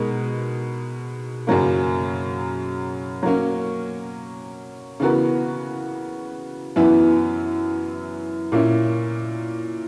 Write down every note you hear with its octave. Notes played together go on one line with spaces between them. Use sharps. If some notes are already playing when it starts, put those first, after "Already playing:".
Already playing: B2 G#3 D#4 A#4
F#2 C#3 F#3 A#3
F#3 A#3 C#4
C#3 E3 B3 F#4 A#4
F#2 E3 B3 E4
A#2 A#3 C#4 E4